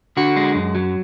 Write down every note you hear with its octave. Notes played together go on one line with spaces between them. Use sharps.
D3 F#4
G#3
F#2
F#3